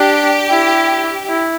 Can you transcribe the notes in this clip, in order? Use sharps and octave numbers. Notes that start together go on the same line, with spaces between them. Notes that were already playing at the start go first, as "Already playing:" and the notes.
Already playing: D4 G4
E4
E4